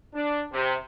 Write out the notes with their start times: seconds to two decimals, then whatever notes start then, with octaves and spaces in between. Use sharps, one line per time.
0.15 D4
0.53 C3